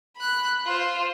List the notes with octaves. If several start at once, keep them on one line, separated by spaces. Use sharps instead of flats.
B5 F#6
F4 C5